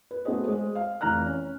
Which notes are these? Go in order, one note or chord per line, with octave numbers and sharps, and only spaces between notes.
B4
A3 B3 F#4 G#4 C5 D#5
G#3 C5
F5
F1 E3 A#5 F6 F#6
C#4